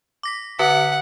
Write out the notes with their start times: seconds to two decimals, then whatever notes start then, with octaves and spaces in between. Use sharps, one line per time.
0.23 D6 A#6 B6
0.59 D3 B4 F#5 B6